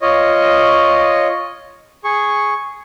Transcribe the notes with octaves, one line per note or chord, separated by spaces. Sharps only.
F4 C#5 D#5
G#4 C#6